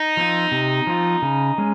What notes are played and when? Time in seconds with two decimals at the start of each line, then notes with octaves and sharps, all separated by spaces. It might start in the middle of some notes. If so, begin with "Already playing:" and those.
Already playing: D#4
0.17 F3 C4 F4
0.52 C3
0.87 F3 C4 F4
1.22 C#3
1.58 G#3 C#4